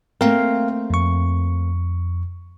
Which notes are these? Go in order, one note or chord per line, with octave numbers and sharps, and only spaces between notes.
A3 A#3 C4 A#4 F5
F2 C#6